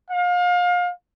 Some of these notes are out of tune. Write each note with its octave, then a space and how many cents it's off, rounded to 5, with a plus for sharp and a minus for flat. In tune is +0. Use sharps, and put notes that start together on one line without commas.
F5 +30